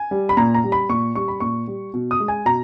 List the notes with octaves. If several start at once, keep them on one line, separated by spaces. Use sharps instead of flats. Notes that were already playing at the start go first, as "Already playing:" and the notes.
Already playing: G#5
G3
B5
A#2 A#5
A#5
G3
B5
A#2 C#6
G3 C#6
B5
A#2 C#6
G3
B2
D#6
G#3
G#5
B2 A#5